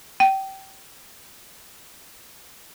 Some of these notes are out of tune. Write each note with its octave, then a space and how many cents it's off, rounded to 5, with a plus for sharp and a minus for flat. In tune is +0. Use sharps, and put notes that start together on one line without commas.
G5 -25